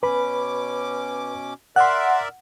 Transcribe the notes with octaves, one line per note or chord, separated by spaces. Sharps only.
B2 C#4 B4 B5 D6
A#4 D5 E5 F#5 C6 F#6